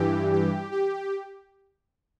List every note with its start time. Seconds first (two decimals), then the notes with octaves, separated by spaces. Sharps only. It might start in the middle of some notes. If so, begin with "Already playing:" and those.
Already playing: G2 E3 G4
0.32 G4
0.72 G4